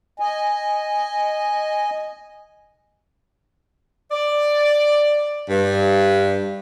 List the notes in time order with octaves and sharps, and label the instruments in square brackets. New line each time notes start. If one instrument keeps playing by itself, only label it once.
[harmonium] D#5 G#5
[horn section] D5
G2